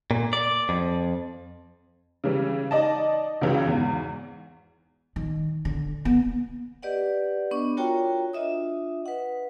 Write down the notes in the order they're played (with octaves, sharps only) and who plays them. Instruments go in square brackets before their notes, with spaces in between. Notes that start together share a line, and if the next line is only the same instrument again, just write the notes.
[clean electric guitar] A#2
D5
F2
[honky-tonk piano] C#3 E3 G3
D#4 D5 D#5 A5
C#2 C#3 E3 F#3
E2 G#2
[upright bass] D#3
D3
B3
[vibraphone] G4 B4 D5 D#5 F#5
B3 D4 C#6
F4 F#4 A#4 C#5 G5 A#5
D4 F4 D#5 E5 D#6
B4 F#5